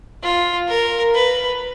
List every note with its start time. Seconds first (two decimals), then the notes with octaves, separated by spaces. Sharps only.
0.23 F4
0.68 A#4
1.14 B4